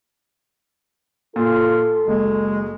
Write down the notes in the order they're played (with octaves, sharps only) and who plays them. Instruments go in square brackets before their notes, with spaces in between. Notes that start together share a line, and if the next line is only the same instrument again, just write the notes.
[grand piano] A#2 [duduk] F4 [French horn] A4
[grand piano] F#1 [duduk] G#3